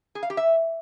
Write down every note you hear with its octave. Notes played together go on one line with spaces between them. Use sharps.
G#4
F5
G4
E5